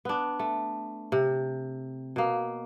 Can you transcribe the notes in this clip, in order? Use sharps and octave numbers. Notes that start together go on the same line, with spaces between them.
B3 D4
A3
C3
B2 A#3